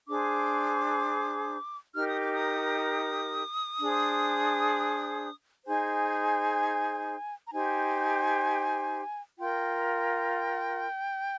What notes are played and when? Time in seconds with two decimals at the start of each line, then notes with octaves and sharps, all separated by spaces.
0.07 D4 G#4 C5 D6
1.94 D#4 G4 A#4 F6
2.07 D#6
2.20 D6
2.32 D#6
3.80 D4 G#4 C5
5.66 D#4 G#4 C5 G#5
7.46 A#5
7.52 D#4 G4 C5 G#5
9.38 F4 A#4 G5